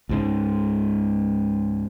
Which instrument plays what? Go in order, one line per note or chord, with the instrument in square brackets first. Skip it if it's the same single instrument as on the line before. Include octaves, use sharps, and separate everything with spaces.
[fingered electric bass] C#2 G#2 C#3